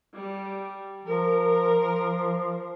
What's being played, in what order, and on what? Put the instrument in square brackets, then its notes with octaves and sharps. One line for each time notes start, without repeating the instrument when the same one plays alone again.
[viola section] G3
[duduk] F3 [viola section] A#4